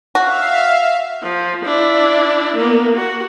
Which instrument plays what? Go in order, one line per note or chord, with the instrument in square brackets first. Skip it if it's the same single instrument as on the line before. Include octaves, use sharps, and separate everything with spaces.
[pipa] F#4 [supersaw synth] E5 F5
[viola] F3
D4 E4
A#3 B3
F#4